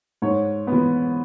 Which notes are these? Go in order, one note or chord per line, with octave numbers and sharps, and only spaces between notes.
G#2 C#5
E3 B3